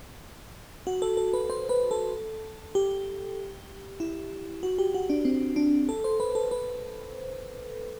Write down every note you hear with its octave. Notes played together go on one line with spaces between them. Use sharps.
F#4
A4
A4
B4
C5
B4
A4
G4
E4
F#4
G4
F#4
D4
C4
D4
A4
C5
B4
A4
B4